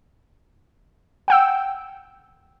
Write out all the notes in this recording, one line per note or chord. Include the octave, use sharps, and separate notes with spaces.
F#5 G5 E6